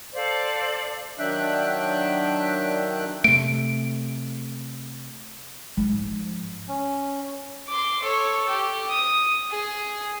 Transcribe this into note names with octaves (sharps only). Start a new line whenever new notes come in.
A4 C5 D5 F5
D#3 F#3 D4 E5 G5 F#6
C3 A3 D7
G#2 F3
C#4
C6 D6
A4 C#5
G4
D#6
G#4